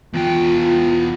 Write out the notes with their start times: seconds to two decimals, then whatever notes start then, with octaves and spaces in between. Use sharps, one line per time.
0.14 E2 F4 G5